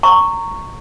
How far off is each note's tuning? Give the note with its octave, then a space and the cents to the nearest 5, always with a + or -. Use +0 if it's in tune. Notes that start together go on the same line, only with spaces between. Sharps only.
A#5 -20 C#6 +0